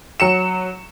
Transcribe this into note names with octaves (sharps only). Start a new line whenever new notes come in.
F#3 C#7 E7